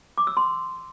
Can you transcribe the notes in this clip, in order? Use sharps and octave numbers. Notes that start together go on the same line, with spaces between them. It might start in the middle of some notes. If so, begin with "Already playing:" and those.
D6
E6
C6